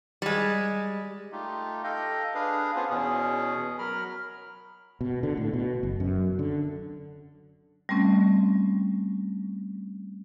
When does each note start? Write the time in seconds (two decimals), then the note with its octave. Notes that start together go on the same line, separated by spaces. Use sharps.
0.22 G3 G#3
1.32 A3 D#4 F4 G4
1.84 A4 D#5 F5 G5 G6
2.34 D4 G#4 B4 F5
2.76 B3 C#4 F4 G#4 C5
2.90 E2 B2 C#4 G#4
3.79 F#3 A#4 B5 F6
5.01 B2
5.23 D3
5.37 A2
5.53 B2
5.83 F#1
6.00 F#2
6.39 D3
7.89 G3 A3 C4 C#4